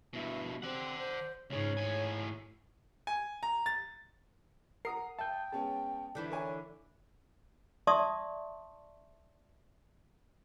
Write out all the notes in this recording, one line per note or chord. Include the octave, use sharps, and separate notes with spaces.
G2 B2 E4
C4 G4 D5 F#5
C5
C#2 G#2 C#3 G#4 C#5 C#6
A2 G#4 G#5 D#7
G#5
A#5
A6
A#4 F#5 A#5 D#6 C7
E5 G5 A5 G6
G#3 B3 C#4 A5
D3 E3 D4 E4 G6
A#4 C#5 D5 G#5
D5 E5 A5 C6 C#6 D#6